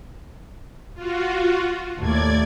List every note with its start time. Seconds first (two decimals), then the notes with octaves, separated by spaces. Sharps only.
0.94 F4 F#4
2.00 D#2 A2 A3 D5 G#6